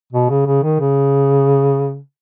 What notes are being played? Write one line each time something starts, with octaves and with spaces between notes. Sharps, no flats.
B2
C#3
C#3
D#3
C#3